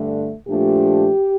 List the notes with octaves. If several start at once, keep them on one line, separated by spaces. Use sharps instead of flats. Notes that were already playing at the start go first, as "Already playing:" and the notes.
Already playing: G2 D3 A3 D4
A#2 F3 A3 D4 G4